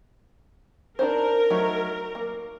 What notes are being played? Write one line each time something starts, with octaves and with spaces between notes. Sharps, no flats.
D4 D#4 A#4 C5
F#3 A3 D#4
A#3